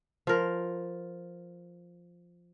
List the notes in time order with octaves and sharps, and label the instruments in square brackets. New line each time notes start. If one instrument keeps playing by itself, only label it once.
[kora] F3 A#4